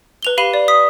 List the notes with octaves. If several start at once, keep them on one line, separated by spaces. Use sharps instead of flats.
B4 F7 G7
G4 F5 B5 D#7 G7
D5
D#6 B6